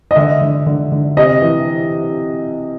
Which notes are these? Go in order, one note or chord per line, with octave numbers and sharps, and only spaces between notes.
D#5
D3 E5
D3
D3
D3
C3 D#5
E3